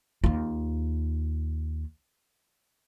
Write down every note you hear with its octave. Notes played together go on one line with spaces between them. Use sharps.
D#2 F4